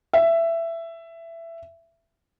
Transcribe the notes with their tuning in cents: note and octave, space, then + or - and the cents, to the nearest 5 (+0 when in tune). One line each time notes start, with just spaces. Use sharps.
E5 +15